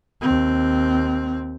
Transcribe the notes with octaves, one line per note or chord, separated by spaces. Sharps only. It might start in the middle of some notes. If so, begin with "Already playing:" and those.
D#2 C4